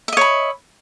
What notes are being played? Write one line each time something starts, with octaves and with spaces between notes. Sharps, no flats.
C#5 D#5 E5 B5